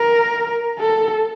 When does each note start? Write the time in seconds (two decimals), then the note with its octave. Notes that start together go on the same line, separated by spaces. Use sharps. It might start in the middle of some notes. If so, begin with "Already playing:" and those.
Already playing: A#4
0.79 A4